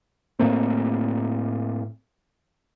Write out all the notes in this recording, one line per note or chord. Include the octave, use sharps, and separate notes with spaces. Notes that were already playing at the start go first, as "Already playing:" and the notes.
A2 A3 A#3 C4